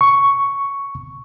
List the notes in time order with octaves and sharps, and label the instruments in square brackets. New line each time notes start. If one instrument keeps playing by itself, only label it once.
[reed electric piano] C#6